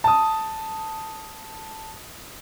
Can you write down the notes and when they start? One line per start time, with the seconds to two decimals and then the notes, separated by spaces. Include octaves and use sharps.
0.04 A5 D#6